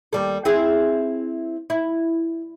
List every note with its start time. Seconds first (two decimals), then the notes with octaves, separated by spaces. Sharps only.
0.13 D#2 G3 A4
0.45 C4 E4 G#4
1.70 E4